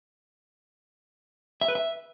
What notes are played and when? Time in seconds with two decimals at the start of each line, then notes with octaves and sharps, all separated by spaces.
1.61 E5
1.68 B4
1.75 E5